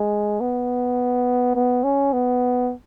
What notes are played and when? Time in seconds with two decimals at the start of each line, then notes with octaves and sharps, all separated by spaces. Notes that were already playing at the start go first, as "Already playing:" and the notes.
Already playing: G#3
0.41 B3
1.56 B3
1.84 C#4
2.13 B3